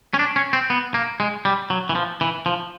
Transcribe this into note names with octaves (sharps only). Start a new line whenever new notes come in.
C#4
D4
C#4
C4
B3
A#3
G#3
G3
F#3
E3
F3
E3
F3